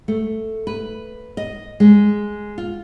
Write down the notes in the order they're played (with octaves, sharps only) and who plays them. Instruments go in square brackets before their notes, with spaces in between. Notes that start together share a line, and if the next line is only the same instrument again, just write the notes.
[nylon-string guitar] A3
B4
D#5
G#3
F4